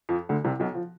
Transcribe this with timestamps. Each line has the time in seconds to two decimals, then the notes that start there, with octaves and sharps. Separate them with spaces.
0.09 F2 F3
0.29 D2 D3
0.44 C2 C3
0.60 B1 B2
0.75 F3